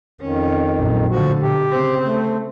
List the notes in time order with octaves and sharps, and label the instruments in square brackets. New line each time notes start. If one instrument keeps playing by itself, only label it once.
[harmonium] F2 D#3 [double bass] C#4
[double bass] A#1 F#2
[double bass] A2 D3 [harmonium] F3 F#4
[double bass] B2 [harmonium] G4
[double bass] C#3 C4
[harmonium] A3